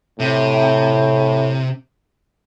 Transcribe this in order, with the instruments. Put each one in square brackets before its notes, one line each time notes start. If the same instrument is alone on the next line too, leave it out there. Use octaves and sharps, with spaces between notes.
[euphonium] A2 [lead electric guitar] C3